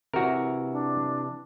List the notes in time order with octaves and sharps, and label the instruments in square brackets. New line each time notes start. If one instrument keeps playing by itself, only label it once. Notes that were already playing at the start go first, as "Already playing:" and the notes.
[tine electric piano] C3 E3 [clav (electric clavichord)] F#4 A#4
[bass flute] D4